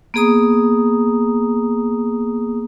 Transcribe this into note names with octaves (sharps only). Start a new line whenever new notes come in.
A#3 B3 G#4 A#5 D#6